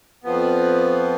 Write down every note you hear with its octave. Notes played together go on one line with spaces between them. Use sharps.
F2 F3 B3